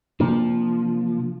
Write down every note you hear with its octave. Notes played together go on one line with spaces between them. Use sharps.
C3 F3 A#3 D4